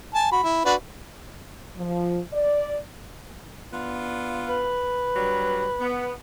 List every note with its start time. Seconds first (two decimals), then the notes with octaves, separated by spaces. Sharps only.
0.15 G#5 A5
0.32 F#4 B5
0.43 E4
0.65 D4 F#4 B4
1.77 F3
2.32 D5
3.73 B3 D4 F4
4.48 B4
5.16 G2 F#3 G3
5.80 B3